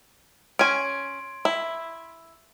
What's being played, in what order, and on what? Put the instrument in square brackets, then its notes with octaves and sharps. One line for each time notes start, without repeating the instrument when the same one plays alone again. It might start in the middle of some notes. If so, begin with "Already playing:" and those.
[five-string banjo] C#4 G#5 [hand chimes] C6 G#6 D7
[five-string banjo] E4